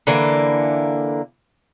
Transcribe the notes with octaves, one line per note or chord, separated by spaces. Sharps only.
D3 E3 A#3 E4